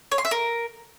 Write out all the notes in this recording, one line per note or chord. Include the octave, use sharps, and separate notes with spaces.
C#5
C6
E5
A#4